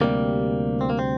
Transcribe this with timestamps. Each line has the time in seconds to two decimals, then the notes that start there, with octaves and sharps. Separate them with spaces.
0.01 D2 C3 D#3 G3 A#3
0.81 C4
0.90 A#3
0.99 C4